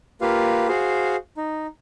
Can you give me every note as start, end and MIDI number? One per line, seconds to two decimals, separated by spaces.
0.21 0.68 58
0.21 0.68 65
0.21 0.68 67
0.21 0.68 71
0.21 0.68 77
0.68 1.16 66
0.68 1.16 68
0.68 1.16 72
0.68 1.16 77
1.37 1.67 63